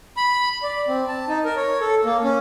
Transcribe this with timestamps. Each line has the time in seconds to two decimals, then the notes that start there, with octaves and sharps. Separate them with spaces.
0.17 B5
0.63 D5
0.88 C4
1.08 A5
1.28 D#4
1.44 A#4
1.56 C#5
1.81 A4
2.05 A#3
2.24 C#4